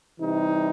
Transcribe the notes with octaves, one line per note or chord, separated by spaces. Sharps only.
C3 E3 G3 D#4